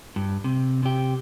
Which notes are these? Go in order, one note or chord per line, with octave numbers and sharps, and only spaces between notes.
G2
C3
C3 G4